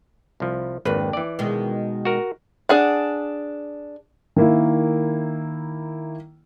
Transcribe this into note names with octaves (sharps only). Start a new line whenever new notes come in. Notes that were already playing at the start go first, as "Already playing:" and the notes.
C2 F3
G#1 F2 A#3 D4 B4
E3 D5
B2 D#3 G#3
F#4 A#4
D4 G#4 F#5
D#3 A#3 E4